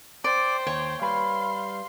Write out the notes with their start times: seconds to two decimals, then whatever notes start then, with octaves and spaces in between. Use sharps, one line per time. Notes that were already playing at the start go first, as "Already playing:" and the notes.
0.24 C5 D5 G5
0.67 D#2 C#5
1.02 G3 B4 F5 C6